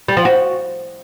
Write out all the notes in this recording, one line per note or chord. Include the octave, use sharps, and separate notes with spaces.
G3
F3
F#4